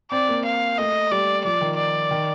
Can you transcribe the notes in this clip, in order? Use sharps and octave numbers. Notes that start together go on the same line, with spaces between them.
C4 D5
A#3
F5
A3 D#5
G3 D5
F3 D5
D#3
D5
D#3